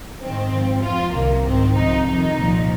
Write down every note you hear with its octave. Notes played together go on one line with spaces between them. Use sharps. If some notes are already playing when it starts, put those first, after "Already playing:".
G#2 D#3 C4
G#2 F3
F2 F3 F4
C2 C3 D#3 A#3
G#2 D#3 C4
C2 C3 F3 D#4
F2 D#3 D#4
C2 A#2 F3